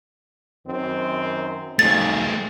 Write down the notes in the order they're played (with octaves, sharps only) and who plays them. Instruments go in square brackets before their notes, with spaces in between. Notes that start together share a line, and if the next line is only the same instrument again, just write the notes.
[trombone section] F#2 D#3 C4
[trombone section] B1 F2 D#3 [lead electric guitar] A3 G#4 [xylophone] A6